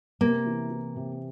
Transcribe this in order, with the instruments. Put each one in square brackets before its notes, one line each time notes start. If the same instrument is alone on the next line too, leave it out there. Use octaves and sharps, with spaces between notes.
[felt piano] C3 [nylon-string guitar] A#3
[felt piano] E3
E3
C3